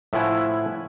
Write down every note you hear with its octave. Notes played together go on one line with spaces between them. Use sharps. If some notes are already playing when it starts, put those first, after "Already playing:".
A2 F3 E4 E5 F#5 G#5